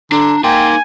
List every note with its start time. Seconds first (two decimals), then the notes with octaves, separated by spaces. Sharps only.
0.12 D3 D4 A#5
0.44 A#3 D#4 G5 G#5 C6